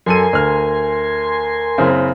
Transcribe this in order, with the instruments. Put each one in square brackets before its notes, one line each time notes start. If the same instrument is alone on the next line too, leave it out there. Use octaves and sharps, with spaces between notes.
[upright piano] F#2 A4 D#7 [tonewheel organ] A#4 G#5 C6
[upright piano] D2 F6
F#1 C#3 C4